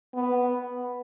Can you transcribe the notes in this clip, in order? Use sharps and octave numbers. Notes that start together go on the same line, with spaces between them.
B3